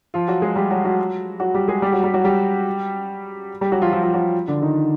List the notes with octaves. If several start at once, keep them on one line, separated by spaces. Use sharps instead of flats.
F3 F4
F#3 F#4
G#3 G#4
G3 G4
F#3 F#4
F#3 F#4
F#3 F#4
G3 G4
G#3 G#4
G3 G4
F#3 F#4
G3 G4
F#3 F#4
G3 G4
G3 G4
F#3 F#4
F3 F4
F3 F4
F3 F4
F#3 F#4
D3 D4
D#3 D#4